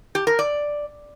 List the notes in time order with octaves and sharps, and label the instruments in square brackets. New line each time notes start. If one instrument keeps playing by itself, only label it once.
[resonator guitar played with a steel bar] G4
A#4
D5